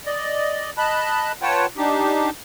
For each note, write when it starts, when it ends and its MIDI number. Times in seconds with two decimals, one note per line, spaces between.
0.06 0.70 74
0.06 0.70 75
0.77 1.32 75
0.77 1.32 81
0.77 1.32 83
0.77 1.32 90
1.42 1.66 65
1.42 1.66 71
1.42 1.66 73
1.42 1.66 78
1.42 1.66 79
1.42 1.66 81
1.77 2.30 62
1.77 2.30 63
1.77 2.30 67